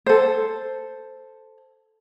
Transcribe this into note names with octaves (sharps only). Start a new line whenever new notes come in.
A4 C5